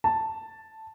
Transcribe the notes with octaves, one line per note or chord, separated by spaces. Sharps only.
A5